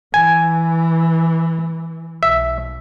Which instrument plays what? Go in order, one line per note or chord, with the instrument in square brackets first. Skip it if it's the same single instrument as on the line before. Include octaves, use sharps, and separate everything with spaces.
[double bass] E3 [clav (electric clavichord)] G#5
[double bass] B1 [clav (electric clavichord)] E5